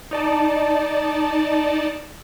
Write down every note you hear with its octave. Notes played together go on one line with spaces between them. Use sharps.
D#4 D5 A5